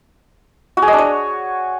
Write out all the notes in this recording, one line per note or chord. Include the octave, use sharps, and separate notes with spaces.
F#4
G#4
D#5
D4
C#5